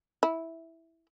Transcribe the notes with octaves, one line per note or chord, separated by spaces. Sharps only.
E4